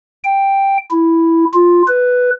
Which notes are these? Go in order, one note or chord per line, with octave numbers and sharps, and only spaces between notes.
G5
E4
F4
B4